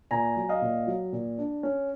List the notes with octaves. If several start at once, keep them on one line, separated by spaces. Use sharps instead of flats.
A#2 G#5 A#5
F#3
D#5 F5
A#2
F#3
A#2
D4
C#4